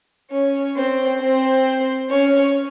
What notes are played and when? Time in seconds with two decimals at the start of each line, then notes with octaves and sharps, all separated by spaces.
0.30 C#4 C#5
0.75 C4 C5
1.19 C4 C5
2.09 C#4 C#5